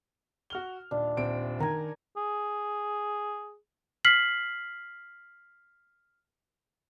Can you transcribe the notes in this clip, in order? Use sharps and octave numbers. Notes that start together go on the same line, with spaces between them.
F#4 F6 G7
D#1 D4
D#1 C4 D7
D#3 A#4 G#5
G#4
F6 B6 C7 F#7